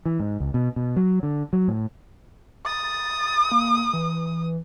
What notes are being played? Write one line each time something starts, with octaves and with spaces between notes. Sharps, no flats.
E3
G#2
C#2
B2
B2
F#3
D3
F#3
A2
D#6 A6
A#3
E3